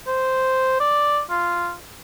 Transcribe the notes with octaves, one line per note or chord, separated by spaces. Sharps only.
C5
D5
F4